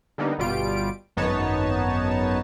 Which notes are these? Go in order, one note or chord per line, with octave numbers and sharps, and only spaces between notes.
D3 G3 A#3 B3 D#4
G1 B2 G3 F4 D7
G#1 F#2 B3 D#4 C#5 A5